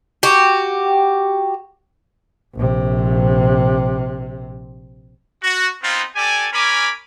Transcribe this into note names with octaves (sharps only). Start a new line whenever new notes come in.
F#4 G4
A#1 C3
F#4
B3 C4 D#4 F4
G4 A4 D5 G#5
C#4 A#4 G#5 B5 D6